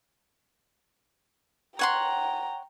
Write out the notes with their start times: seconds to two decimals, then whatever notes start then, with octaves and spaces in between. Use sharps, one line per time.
1.79 C#5 F#5 G5 A#5 C6